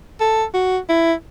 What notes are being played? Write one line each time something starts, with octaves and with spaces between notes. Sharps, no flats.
A4
F#4
E4